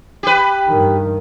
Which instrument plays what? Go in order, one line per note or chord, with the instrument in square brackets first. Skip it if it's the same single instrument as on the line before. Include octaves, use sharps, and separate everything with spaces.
[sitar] G4 B4
[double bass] G2 D#3